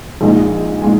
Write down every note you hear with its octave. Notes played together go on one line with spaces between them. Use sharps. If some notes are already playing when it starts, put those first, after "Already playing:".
A#1 A#2 G#3 D#4 G#4
A#2 G#3 D#4 G#4